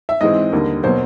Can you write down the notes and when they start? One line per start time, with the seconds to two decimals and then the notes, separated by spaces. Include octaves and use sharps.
0.09 E5
0.21 G#2 E3 G#3 C4 D#5
0.52 D#2 D3 G3 A#3
0.83 B2 F#3 A#3 C5